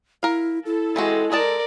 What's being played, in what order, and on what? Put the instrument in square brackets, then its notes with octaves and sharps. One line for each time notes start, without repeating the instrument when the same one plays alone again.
[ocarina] E4 [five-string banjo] A#4 F5
[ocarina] E4 [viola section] A4
[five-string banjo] E3 C4 F#4 [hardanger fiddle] G#3
[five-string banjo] G#3 D#5 A5 [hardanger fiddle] A#4 D5